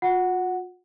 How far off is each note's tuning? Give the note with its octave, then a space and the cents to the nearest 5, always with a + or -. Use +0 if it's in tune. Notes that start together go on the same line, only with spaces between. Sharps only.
F4 +45 F#5 +0